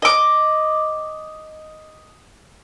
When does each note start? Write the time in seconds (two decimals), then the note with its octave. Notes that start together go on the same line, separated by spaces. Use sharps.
0.02 D#5 D6